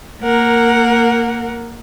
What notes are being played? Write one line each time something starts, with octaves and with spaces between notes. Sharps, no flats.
A#3 A#4 F#5